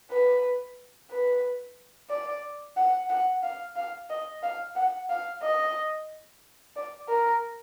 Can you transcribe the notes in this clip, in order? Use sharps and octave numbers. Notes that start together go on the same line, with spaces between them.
B4
B4
D5
F#5
F#5
F5
F5
D#5
F5
F#5
F5
D#5
D5
A#4